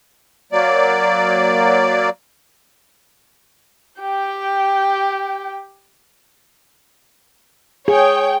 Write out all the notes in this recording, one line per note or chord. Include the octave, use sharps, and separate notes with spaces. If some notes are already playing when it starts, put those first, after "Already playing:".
F#3 A#3 D5
G4 G5
G#4 C#5 G5